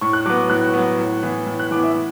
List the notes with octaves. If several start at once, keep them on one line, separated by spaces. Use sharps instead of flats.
A2 C#6
F#6
F#3 B3 D6
A2 F#6
F#3 B3
A2
E3 B3
A2
F#6
E3 B3 D6
E5
E3